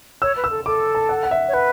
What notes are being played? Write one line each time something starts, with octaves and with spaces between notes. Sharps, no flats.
C#5 E6
B4
E6
A4
A4 D6
A5
F#5
F#5
E5
C#5
B4 F#5